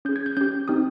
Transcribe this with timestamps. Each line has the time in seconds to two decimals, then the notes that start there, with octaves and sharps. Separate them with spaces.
0.05 C#4 G6
0.09 G#4
0.16 G#6
0.26 G6
0.37 C#4 G4 G6
0.68 C4 D#4 G4 D#6